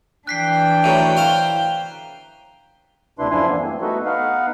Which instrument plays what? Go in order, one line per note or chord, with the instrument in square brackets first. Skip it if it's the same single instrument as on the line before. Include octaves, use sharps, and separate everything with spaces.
[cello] E3 D4 [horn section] G5 [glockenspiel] F#6 B6 C7
[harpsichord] A2 F#3 [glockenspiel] A#5 D#7
[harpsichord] C5 F5 C6 [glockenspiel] G7
[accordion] D2 C3 D4 E4 B4 C6
F#2 F3 D4 E4 G#5 C6
E3 A#3 B3 D4
G3 A3 C4
A3 B3 D#4 F#4 A4 B4
B3 D#4 B4 F5 F#5